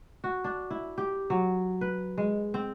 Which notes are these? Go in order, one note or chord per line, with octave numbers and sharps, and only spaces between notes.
F#4
D4
E4
G4
F#3
B4
G#3
C4